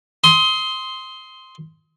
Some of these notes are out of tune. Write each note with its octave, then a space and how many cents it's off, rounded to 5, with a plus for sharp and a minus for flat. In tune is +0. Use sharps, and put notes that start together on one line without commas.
C6 +0 D#6 +30